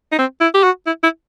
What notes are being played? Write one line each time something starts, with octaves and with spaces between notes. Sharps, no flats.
D#4
C4
E4
G4
F#4
E4
E4